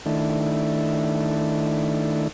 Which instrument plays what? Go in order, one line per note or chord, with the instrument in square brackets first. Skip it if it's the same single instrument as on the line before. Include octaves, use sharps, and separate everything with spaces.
[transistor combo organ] D#3 A3 D4 E4